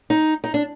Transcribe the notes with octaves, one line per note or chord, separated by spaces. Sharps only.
D#4
D#4
D4